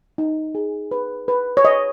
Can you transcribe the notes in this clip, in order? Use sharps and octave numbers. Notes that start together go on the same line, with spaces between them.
D#4
G#4
B4
B4
C#5
B4 D#5